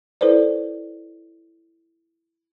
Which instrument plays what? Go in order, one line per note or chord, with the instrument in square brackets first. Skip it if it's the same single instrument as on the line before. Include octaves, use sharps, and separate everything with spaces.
[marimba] E4 A4 B4 C5 D5